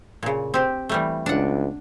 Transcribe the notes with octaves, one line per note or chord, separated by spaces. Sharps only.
A#2 C#3
C4 G4
E3 G3 A3
C#2 D4 F#5